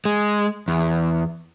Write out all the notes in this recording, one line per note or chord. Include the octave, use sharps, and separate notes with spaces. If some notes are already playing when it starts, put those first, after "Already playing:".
G#3
E2